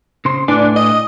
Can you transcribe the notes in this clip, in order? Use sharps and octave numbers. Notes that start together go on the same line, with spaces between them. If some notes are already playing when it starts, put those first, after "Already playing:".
C#3 C5 C6
A2 D4 B4 G#5
D#5